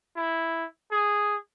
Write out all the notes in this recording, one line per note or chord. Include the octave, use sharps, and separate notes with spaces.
E4
G#4